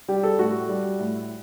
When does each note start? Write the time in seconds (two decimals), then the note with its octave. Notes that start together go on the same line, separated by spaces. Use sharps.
0.08 G3 G4
0.23 A4
0.39 A2 F#4
0.69 G3
0.99 A2